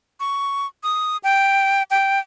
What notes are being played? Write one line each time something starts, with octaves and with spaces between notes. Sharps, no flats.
C#6
D#6
G5
G5